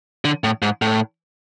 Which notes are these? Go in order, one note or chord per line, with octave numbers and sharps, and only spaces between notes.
D3
A2
G#2
A2